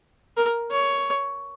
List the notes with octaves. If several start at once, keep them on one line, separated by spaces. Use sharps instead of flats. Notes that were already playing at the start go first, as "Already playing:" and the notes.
A#4
C#5